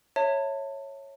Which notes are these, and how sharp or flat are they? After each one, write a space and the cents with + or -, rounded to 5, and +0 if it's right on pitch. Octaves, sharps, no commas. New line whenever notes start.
C#5 -5 E5 +0 A5 +40